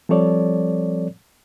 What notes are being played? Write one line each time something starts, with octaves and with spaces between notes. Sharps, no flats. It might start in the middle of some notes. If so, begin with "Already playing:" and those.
F3 G3 C4 A4 C#5 D5